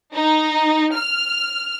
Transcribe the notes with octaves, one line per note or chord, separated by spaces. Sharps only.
D#4
F6